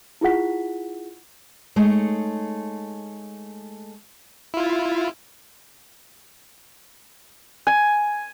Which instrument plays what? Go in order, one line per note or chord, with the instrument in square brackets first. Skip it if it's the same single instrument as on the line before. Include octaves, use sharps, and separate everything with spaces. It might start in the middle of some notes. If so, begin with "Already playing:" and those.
[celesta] E4 F4 G#4 F#5 B6
[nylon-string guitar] G#3 A3 D#4 C#5
[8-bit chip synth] E4 F4
[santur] G#5